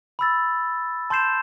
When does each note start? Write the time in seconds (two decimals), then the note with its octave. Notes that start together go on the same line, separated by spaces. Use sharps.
0.19 B5 E6 A6
1.10 A5 C6 G6 C7 E7